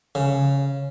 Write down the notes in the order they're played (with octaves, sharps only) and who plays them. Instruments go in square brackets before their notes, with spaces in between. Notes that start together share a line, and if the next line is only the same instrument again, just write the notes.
[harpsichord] C#3